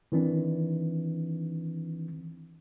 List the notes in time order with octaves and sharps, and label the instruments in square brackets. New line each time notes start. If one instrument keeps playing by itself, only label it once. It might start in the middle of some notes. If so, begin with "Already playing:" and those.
[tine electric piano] D#3 E3 C4 D4